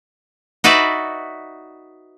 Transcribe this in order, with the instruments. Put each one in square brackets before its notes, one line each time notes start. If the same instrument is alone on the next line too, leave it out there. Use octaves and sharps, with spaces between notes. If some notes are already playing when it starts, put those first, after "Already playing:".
[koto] D#4 F#4 B4 D5 E5